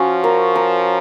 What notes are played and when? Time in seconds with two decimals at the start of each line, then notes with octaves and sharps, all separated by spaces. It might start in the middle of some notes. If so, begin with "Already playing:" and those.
Already playing: F3 C#4 F#4
0.24 A#4
0.56 A#4